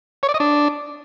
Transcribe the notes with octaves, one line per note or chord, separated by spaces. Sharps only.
C#5
D5
D#5
D4